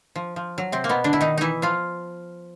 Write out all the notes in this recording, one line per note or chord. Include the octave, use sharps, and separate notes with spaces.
F3
F3
F#3
C3 C4
A#3
B2 B3
D3 D4
E4
D#3 D#4
E3 D#4 E4
F3 F4